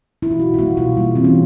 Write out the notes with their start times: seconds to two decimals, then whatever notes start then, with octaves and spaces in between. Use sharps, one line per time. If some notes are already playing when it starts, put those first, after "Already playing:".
0.23 E4
0.31 F4
0.39 B2 F#4
0.54 F4
0.58 G3 A#3 F#4
0.77 B2 F4
0.97 G3 A#3
1.15 E3 C4
1.24 C#4